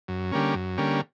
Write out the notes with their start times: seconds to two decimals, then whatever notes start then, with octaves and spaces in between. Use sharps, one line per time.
0.08 F#2
0.32 D3 G3 A#3 C#4
0.55 F#2
0.78 D3 G3 A#3 C#4